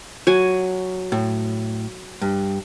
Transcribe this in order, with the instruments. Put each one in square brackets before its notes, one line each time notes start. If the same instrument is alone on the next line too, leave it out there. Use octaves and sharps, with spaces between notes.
[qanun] F#3 G#5
[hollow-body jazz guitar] A2
G2